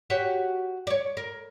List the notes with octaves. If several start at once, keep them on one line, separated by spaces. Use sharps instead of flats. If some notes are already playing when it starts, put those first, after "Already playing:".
F#4 G4 C#5
C#5 D5
A#4